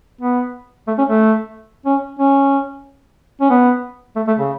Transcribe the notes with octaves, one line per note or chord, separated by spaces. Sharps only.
B3
A3
C#4
A3
C#4
C#4
C#4
B3
A3
A3
C#3